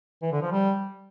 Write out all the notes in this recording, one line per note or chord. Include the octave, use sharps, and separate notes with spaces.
E3
D3
F3
G3